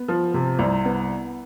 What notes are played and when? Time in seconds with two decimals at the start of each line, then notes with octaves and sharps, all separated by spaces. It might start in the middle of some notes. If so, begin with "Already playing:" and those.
Already playing: B3
0.08 F3
0.34 C3
0.59 C2
0.85 B3